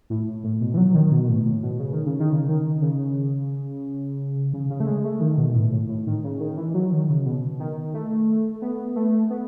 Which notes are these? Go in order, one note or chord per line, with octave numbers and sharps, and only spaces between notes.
A2
A2
B2
E3
F#3
D#3
B2
A2
A2
B2
C#3
D#3
C#3
D#3
C#3
D#3
C#3
C#3
C#3
A3
G#3
A3
D#3
B2
A2
A2
A2
D#3
C#3
D#3
E3
F#3
D#3
C#3
B2
D#3
A3
B3
A3
B3